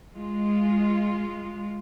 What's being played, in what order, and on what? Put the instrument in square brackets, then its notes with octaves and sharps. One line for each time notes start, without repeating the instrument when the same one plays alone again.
[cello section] G#3 F4